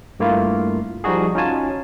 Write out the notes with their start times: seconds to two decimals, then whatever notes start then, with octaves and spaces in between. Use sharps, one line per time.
0.20 G2 A3 A#3 E4 F4
1.04 F3 G3 D#4 F#4 G#4
1.35 C#4 D#4 F4 F#4 G#5 A5